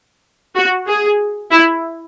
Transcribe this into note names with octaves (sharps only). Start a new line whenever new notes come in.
F#4
G#4
E4